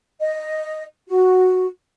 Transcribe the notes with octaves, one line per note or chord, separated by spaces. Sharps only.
D#5
F#4